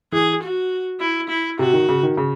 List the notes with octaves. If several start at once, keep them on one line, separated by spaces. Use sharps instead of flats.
E3 G#4
F#4
E4
E4
C3 F#4
D#3
C#3
D#3
C#3